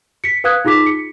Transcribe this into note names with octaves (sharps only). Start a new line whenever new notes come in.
B6 C#7
B4 F5 D#6 F#6 G#6
D#4 F4 G#4 D6 B6
C#7